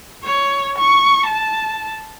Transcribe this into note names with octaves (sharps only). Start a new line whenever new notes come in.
C#5
C#6
A5